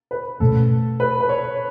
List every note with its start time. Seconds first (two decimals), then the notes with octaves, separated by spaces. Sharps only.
0.11 B4
0.40 B2 A3 C#4 A4
1.00 B4
1.20 B4
1.29 C#5